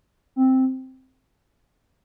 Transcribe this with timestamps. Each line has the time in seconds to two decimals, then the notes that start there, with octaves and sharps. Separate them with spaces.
0.36 C4